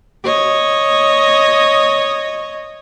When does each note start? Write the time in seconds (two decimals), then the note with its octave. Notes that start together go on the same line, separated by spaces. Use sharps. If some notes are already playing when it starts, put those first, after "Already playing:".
0.24 C#5 D#5